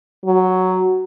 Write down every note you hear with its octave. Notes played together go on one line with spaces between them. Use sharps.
F#3